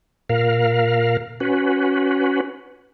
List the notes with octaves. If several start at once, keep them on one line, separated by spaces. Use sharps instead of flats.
A#2 A#4 F5
C#4 F#4 B4